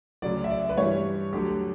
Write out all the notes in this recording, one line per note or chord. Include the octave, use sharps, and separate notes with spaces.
D2 C#3 F#3 D5
E5
D5
B4
G2 E3 G3 C#5
D2 D3 F#3 G4